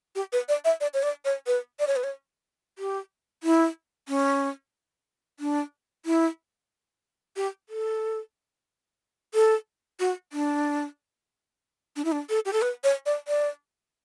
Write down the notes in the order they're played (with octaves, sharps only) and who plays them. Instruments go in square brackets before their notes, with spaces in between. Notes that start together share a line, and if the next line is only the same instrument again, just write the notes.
[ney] G4
B4
D5
E5
D5
C#5
D5
C#5
B4
D5
C#5
B4
C#5
G4
E4
C#4
D4
E4
G4
A4
A4
F#4
D4
D4
E4
D4
A4
G4
A4
B4
C#5
D5
D5